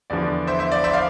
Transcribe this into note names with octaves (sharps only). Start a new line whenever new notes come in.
E2 D3 F3 D5
C5 E5
C5 E5
D5
C5 E5
D5 F5